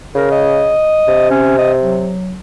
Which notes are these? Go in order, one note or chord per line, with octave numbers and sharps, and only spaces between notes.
C#3 A#4
D#5
C3
C#4
D#5
F#3